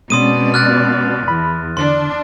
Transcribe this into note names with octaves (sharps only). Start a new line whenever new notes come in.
B2 G#3 C4 C#4 D5 C6 D#6 D#7
F6 F#6 A6
E2 B5
D3 D4 C6